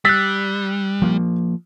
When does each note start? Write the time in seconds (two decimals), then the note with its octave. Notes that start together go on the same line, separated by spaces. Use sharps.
0.05 G3 E6 F#6 A6 B6
1.02 F3 A#3